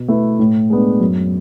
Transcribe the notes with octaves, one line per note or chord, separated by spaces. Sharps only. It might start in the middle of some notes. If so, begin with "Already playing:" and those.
Already playing: B2
A3 E4 B4
A2
G#3 B3 D4
F#2